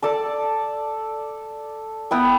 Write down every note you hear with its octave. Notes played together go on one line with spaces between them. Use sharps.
A4 D5 A5
B3 E4 G5